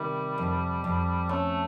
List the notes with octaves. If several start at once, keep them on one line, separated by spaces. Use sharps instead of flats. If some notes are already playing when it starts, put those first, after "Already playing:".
Already playing: C3 D#3 G3
F2
F2
A3 C#4